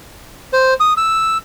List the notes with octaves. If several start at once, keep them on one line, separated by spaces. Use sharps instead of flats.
C5
D#6
E6